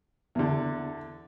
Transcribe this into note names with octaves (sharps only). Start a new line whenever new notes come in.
E2 D3